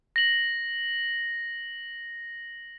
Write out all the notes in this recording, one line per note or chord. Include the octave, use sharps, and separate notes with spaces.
A#6 F#7